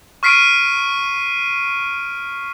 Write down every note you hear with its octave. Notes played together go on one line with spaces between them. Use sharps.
C#6 F6 B6 C7 D7 D#7